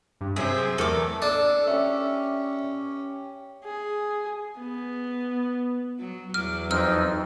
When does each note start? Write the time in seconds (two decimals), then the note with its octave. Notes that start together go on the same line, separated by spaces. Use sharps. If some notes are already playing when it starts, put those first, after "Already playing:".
0.21 G2
0.36 C3 F#3 C4 G#4 C5 E5
0.78 E2 A3 A4 A#4 D6
1.22 D4 A4
1.67 C#4 G4 E5
3.64 G#4
4.59 B3
5.99 F#3
6.34 E2 F#3 D6 F6
6.71 F2 F3 D#4 E6 F6